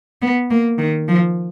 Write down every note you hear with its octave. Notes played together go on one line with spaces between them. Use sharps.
B3
A#3
D#3
F3